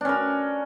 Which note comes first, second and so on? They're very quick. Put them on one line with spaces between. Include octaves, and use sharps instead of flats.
D4 C#4 A#4